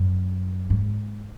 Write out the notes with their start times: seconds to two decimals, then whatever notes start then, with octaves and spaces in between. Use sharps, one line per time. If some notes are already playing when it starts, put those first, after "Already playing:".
Already playing: F#2
0.70 G#2